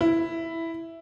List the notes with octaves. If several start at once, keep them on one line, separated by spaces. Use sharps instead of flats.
E4